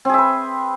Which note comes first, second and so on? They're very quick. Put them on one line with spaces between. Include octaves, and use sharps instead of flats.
C4 G#4 E5 B4